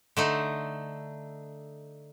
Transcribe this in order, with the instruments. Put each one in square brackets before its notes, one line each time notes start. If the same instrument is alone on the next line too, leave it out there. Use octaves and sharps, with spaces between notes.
[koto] D3 A3 D#4